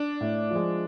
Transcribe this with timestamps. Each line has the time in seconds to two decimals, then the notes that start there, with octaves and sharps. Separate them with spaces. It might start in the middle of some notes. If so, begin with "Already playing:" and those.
Already playing: D4
0.21 A2
0.51 F3 G#3